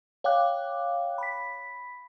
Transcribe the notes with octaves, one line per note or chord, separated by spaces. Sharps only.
C#5 F5 G5 D6 F#6
B5 B6